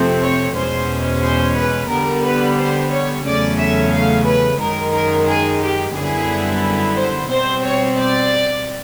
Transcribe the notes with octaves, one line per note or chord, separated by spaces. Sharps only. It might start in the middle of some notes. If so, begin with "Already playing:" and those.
Already playing: F2 C3 F3 A3 C4
C#5
E2 B2 G#3 C#4 C5
C5
B4
D3 G3 B3 A#4
B4
C5
C#5
E2 C#3 F#3 A3 C#4 D5
E5
F5
B4
F#2 D#3 G#3 A#4
A#4
G#4
G4
F#2 D3 G3 B3 E4 G#4
C5
B2 G3 C4 C5
C#5
D5